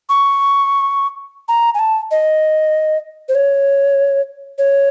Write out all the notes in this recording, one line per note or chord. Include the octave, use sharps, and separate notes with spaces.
C#6
A#5
G#5
A5
D#5
C5
C#5
C#5